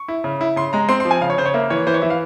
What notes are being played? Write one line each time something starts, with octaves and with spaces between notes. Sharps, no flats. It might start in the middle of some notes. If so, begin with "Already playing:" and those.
Already playing: C#6
E4
C#3
E4
C#3 C6
G#3 A#5
C4 C6
C6
F3
G#5
C#3 F5
C#5
C#3 C5
C#5
A#3 E5
E3 C#5
E3 C5
C#5
E3 E5
F5